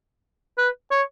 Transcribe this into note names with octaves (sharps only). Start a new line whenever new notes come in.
B4
C#5